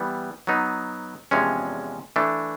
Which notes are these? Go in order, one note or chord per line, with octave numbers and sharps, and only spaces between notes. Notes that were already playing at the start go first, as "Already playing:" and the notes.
Already playing: E3 G3 B3
F#3 B3 D#4
E2 C3 F3 G#3 C#4
E3 A3 D4